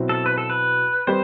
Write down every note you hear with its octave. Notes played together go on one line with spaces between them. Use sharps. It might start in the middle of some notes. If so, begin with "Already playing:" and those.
Already playing: B2 F#3 C4 E4
A4
B4
A4
B4
G3 C4 G4 B4 C5